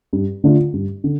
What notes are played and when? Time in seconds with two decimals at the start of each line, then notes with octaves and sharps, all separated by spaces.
0.13 G2
0.44 D3 A3 D4 F4
0.73 G2
1.04 D3